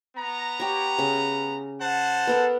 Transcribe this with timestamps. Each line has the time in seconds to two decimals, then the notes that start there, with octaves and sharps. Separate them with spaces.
0.17 B3 A#5
0.60 G4 C#5
0.99 C#3
1.81 C5 F#5 A5
2.27 B3 A4 A#4